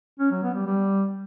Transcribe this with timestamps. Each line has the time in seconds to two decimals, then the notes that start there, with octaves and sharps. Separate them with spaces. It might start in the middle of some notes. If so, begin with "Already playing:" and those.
0.20 C#4
0.31 F#3
0.43 B3
0.54 G3
0.66 G3